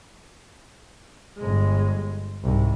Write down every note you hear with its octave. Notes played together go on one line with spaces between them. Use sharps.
G1 G#3
C2 G#2